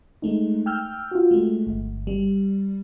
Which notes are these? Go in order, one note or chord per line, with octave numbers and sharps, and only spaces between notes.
G#3 A3 D#4
G5 E6 F6 G6
F4 F#4
G#3 A3
G1
G3